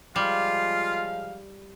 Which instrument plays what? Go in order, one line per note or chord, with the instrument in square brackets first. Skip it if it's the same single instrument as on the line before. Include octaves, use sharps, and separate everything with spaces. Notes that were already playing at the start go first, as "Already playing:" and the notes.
[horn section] F3 G#3 F5 [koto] G3 [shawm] F4